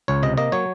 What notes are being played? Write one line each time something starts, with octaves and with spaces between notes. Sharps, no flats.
C#2 C#5
C3 D#5
A#3 D#5
F#3 C#5